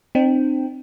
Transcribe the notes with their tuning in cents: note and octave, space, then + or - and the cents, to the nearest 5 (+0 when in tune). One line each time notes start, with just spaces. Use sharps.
C4 +0 D#4 -45 G5 +0